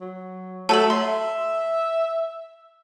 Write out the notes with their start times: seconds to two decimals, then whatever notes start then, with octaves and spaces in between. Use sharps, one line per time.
0.01 F#3
0.69 F#3 A3 A4 A5 F#7
0.90 E5 C6